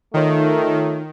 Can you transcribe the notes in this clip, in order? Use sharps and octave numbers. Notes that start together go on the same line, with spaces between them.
D#3 A3 D#4 F4 C#5